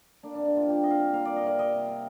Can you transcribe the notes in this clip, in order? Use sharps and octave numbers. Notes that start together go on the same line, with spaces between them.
A#3 D4
C3 D4
D4
C3 F4
G3 G4
C3 D#5
F5
C3
A#3 F5
C3 D5
D#5
C3 D5
G3 D#5
C3
C3